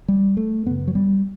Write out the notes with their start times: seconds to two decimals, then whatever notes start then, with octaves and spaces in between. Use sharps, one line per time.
0.08 G3
0.37 A3
0.66 F#2 C#3 B3
0.88 F#3
0.95 G3